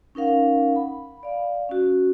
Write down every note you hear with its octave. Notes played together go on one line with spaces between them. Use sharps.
C#4 D#4 A#4 F5 F#5
B5
D5 F5
C#4 F#4